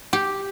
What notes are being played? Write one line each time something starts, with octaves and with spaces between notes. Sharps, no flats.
G4